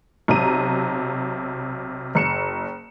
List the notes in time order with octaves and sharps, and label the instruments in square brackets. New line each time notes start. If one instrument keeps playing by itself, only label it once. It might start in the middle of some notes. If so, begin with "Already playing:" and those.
[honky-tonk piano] B1 C3 A#5 D#7
F#1 C#7 E7